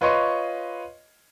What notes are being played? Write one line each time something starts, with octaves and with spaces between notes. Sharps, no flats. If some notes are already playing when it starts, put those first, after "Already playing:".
F4 B4 C#5 D#5 C6 C#6